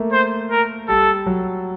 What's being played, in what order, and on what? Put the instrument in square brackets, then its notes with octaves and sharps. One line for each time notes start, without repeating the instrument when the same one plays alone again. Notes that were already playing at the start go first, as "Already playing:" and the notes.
Already playing: [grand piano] A3 A#3
[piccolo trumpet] C5
A#4
[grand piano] G3 [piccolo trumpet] A4
[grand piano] F#3